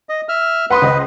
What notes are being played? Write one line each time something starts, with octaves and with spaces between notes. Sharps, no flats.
D#5
E5 F6
B4 F#5 C6 D#6
C#2 C5 D#5